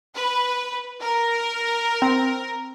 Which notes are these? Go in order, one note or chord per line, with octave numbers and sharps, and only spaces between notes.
B4
A#4
C4